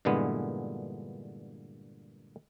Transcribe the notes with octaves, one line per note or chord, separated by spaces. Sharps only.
G2 A#2 D3 E3 G#3 B3